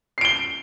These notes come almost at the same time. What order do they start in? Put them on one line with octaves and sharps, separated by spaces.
C7 D7 G7